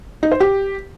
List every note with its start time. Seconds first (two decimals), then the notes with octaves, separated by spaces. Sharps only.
0.23 D#4
0.32 C5
0.40 G4